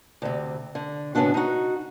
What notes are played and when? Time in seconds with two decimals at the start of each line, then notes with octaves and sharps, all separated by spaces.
0.22 D2 C3
0.75 D3
1.15 A2 C#3 B3 C4 D4 F#4
1.34 D#4 F#4